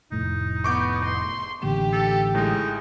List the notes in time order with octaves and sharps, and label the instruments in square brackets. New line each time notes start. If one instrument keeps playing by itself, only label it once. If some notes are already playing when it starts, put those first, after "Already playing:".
[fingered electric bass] F1 A2 [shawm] D#4
[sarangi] B3 [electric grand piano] C#6 D6 G6
[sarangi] C6
[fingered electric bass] A1 D3 A#3 [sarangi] G4
[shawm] A4
[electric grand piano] A2 G#3 [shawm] D#4